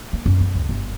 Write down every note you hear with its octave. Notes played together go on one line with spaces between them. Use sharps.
A#3
F#2
C4
C#2
G1